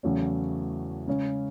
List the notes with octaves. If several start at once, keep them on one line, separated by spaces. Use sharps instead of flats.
E2 C#3 F#3 A3 C#4
C#3 G#3 C#4